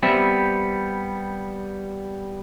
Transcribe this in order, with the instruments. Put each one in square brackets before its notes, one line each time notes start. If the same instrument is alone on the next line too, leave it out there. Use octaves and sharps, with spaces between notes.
[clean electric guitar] G3 B3 C4 E5